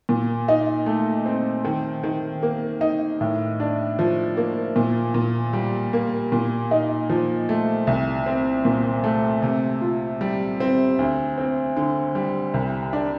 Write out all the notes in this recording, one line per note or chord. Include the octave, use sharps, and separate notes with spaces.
A#2
D#4
A3
C4
D#3
D#3
A#3
D#4
A2
D4
F3
A#3
A#2
A#2
G3
A#3
A#2
D#4
F3
A3
C2
C4
A#2
A3
C3
F4
G3
C4
D2
C4
D3
G3
C2
D4